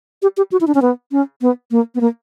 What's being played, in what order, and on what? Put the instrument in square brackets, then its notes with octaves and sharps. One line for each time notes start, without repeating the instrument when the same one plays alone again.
[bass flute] G4
G4
F#4
E4
D4
C#4
B3
C#4
B3
A#3
B3
A#3